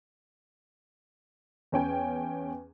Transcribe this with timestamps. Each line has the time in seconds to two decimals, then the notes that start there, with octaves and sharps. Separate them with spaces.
1.72 E2 C#4 G5 G#5